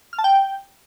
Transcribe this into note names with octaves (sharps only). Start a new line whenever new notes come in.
F6
A5
G5